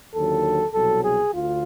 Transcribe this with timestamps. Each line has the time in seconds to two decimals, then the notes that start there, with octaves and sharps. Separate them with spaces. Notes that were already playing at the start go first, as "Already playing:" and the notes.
0.13 D#2 D3 F#3 A4
0.73 C2 B2 F#3 A4
1.03 G#4
1.32 D2 D3 F4